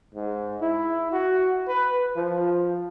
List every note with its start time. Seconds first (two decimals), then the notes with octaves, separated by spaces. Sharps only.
0.15 G#2
0.61 E4
1.12 F#4
1.68 B4
2.16 F3